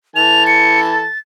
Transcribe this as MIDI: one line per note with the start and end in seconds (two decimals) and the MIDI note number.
0.16 1.06 52
0.16 1.06 69
0.16 1.06 81
0.16 0.44 101
0.47 0.83 97
0.83 1.19 93